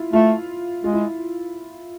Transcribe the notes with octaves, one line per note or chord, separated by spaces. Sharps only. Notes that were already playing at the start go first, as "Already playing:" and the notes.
Already playing: E4 F4
A3 F4
G#3 F4
E4